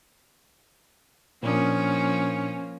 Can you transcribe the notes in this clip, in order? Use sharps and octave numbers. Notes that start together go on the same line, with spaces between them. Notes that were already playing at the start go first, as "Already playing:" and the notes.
A#2 F3 A#3 C#4 D4 D#6